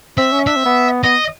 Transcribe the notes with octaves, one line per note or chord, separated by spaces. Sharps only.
C4 E5
C#4
D4 E5
C4
B3
B3 D#5